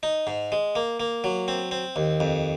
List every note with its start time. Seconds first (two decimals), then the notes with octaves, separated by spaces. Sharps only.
0.03 D#4
0.27 G#2
0.52 G#3
0.76 A#3
1.00 A#3
1.24 F#3
1.48 C4
1.71 C4
1.96 D#2
2.20 F2